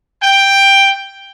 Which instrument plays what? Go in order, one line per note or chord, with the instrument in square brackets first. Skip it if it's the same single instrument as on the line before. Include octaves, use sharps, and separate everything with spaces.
[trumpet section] G5